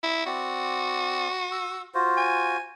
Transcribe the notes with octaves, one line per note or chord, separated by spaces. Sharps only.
E4
C4 F#4 D5
E6
F4 F#4 C5
G#5